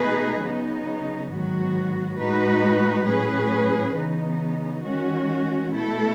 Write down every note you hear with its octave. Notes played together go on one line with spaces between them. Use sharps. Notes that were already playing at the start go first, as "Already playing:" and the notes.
Already playing: B2 A3 D#4 G#4 B4
C#3 F#3 B3 D#4
G#2 D#3 F#3 B3 F#4
A2 G#3 D#4 F#4 B4
A2 F#3 C#4 G#4 B4
C#3 E3 B3 D#4
D#3 G#3 C#4 F#4
B2 A3 E4 A4